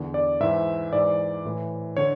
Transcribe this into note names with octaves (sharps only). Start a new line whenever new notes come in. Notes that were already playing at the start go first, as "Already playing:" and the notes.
Already playing: E2 D3
D5
G#2 E3 E5
G#2 E3 D5
A2 E3
D3 C#5